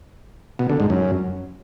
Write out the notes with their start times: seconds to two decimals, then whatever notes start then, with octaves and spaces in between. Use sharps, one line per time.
0.59 B2
0.70 D3
0.80 G#2
0.90 F#2